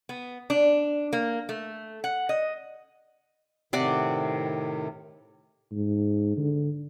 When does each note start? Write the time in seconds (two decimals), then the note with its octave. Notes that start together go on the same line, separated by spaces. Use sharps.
0.09 B3
0.50 D4
1.13 A#3
1.49 A3
2.04 F#5
2.29 D#5
3.73 A2 C3 D#3 D5 F#5
5.72 G#2
6.37 D3